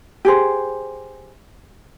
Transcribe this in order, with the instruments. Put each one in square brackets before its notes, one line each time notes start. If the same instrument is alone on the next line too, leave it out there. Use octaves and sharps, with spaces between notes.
[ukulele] G4 G#4 C5